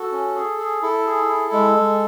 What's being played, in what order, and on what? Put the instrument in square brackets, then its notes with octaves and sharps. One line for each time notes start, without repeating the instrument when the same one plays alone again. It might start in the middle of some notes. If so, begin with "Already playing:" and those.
Already playing: [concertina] F#4 A4
C#4
G#4
G#4
E4 A4
G#4
E4
G#3
G#3